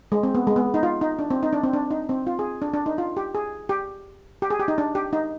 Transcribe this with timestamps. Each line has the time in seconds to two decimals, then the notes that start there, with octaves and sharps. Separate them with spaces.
0.12 G#3
0.23 C4
0.35 B3
0.47 G#3
0.56 B3
0.74 D#4
0.83 F4
1.01 D#4
1.19 D4
1.30 C4
1.43 D#4
1.53 D4
1.63 C4
1.73 D4
1.91 D#4
2.09 C4
2.27 F4
2.39 G#4
2.62 D4
2.74 D4
2.86 D#4
2.98 F4
3.17 G4
3.35 G#4
3.69 G4
4.42 G4
4.50 G#4
4.60 G4
4.68 D#4
4.78 D4
4.95 G4
5.13 D#4